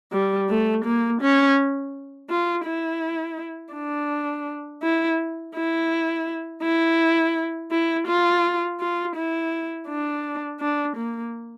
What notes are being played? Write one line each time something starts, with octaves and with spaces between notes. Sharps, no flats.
G3
A3
A#3
C#4
F4
E4
D4
E4
E4
E4
E4
F4
F4
E4
D4
D4
A#3